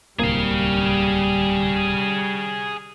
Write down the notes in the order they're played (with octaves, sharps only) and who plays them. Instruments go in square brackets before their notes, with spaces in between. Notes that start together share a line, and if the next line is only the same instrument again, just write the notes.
[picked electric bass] D1 C2 A#3 [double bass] G3 [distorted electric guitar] G#4 F5